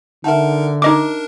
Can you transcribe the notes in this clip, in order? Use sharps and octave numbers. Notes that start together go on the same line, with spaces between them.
D3 D#4 A#4 E5 F#5 A5
D4 D#4 A#4 D#5 D6